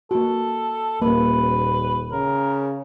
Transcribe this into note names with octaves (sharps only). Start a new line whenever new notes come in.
A#3 F#4 A4
D#1 A#3 B4
C#3 A#4